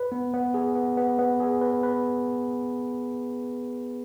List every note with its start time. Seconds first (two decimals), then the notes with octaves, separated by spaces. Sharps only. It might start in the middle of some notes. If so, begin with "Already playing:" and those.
Already playing: B4
0.12 B3
0.34 B3
0.54 G#4
0.75 B3
0.97 B3
1.19 B3
1.40 G#4
1.61 B4
1.83 B4